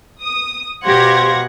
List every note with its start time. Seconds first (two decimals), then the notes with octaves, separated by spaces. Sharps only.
0.22 D#6
0.85 B2 G4 C5 F5 F#5 G#6 A#6